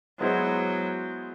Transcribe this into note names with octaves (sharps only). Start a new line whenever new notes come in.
F#3 G#3 B3 E4 G#4 C5